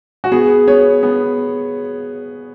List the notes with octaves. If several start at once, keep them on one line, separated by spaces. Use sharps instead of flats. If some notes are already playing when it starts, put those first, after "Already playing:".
F#4
B3 G#4
B3 C#5
B3